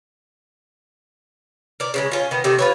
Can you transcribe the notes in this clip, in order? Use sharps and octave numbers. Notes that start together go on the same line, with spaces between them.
A#4 D5
C#3 E3 G#3
C#4 F4
D#3 B3
C3 D#3 A3
F4 B4 C#5